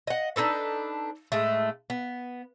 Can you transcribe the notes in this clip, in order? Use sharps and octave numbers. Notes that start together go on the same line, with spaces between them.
D#5 F#5
D4 D#4 A4 B4
A2 G#3 A3
B3